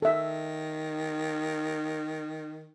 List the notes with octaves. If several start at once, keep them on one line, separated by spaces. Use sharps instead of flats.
D#3 A4 E5